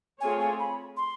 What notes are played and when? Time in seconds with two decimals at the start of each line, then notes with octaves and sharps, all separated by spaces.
0.21 A3 C4 F4 G#4 C#5 G#5
0.40 G#5
0.59 B5
0.97 C6